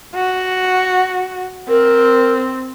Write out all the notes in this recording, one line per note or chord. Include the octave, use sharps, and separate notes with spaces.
F#4
C4 A#4